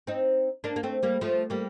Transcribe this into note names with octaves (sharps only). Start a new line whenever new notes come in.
C4 D#4
A#3 D4
A#3
A3 C4
G3 A#3
F3 A3
G3 A#3